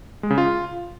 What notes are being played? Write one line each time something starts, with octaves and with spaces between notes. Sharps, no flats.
G#3
C#3
F4